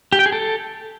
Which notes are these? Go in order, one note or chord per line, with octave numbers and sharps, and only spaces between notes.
G4
G5
G#4
A4